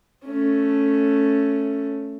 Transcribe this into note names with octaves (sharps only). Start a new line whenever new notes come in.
A3 C#4